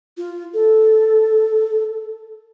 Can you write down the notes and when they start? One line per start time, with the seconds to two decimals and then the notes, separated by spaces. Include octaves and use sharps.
0.17 F4
0.54 A4